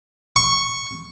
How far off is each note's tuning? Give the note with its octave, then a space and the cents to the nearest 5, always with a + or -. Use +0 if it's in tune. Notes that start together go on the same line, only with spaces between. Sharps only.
C#6 -5